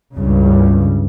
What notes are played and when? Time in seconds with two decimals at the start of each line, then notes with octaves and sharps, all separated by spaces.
0.15 C#2 G2 C#3